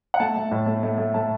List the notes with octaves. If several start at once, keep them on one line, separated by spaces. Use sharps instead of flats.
F#5
A3 A5
A3
A2
A3
A3
A3
A3 A5